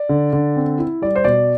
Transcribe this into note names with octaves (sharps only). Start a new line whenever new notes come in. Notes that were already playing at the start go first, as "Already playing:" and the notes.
Already playing: D5
D3
D3
C4
E4
G3 D5
C5
B2 D5